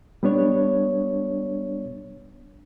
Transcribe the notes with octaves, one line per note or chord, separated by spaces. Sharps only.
G3 B3 D4 C#5